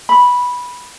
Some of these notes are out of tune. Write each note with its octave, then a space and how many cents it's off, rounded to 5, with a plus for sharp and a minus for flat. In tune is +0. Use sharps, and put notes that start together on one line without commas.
B5 -10